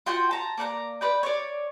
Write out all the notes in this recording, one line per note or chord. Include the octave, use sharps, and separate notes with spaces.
F4 F#4 G5
A5 A#5
A#3 D5 F#5 A#5
B4 D5 G5
C#5 D5